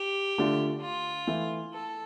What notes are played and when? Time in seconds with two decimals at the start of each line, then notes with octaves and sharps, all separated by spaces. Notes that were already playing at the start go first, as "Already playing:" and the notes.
Already playing: G4
0.38 D3 A3 D4 F4
0.82 F4
1.27 E3 A3 E4
1.72 A4